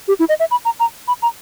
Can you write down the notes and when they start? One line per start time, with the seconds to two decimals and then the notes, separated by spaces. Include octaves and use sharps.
0.08 G4
0.19 E4
0.29 D#5
0.40 E5
0.51 B5
0.65 A#5
0.80 A#5
1.08 B5
1.22 A#5